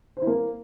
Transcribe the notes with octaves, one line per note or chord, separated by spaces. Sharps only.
C5
E4
A#3